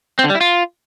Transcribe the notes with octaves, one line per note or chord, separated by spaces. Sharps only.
C4
D3
G3
E4
F4